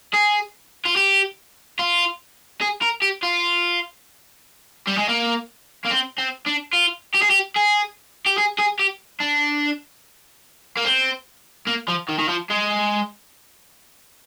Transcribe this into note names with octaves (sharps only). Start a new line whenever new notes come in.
G#4
F4
G4
F4
G#4
A#4
G4
F4
G3
G#3
A#3
A#3
C4
C4
D4
F4
G4
G#4
G4
G#4
G4
G#4
G#4
G4
D4
A#3
C4
A#3
F3
D#3
D#3
F3
G#3